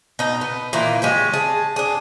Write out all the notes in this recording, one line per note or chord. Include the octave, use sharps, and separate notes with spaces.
B2 D#4
B3
A#2 D#3 E3 A#3
G#3 C#4 G4
G#4 A5
D4 G#4